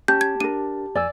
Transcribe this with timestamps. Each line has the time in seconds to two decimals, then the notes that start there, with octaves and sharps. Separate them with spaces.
0.08 C#4 G4 A5 G6
0.21 G#6
0.40 D4 A#4 D#7
0.95 F2 D5 G#5 E6